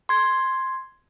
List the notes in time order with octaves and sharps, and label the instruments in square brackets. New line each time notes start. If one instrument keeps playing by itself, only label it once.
[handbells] C6 G#6